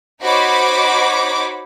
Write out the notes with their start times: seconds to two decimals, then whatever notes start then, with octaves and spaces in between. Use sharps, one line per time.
0.22 D#4 F#4 C5 C#5 B5 D6